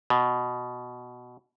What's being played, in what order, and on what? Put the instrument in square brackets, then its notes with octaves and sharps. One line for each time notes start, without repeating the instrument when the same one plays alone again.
[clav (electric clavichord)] B2